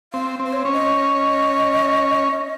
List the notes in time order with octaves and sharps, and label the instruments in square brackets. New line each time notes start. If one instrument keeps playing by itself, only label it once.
[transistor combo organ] C4 [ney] F5
[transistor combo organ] C4
[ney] C5
C#5
[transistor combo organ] C#4
[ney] D#5